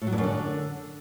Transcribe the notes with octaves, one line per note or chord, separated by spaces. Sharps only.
A2
F#3
G2
F#2
D3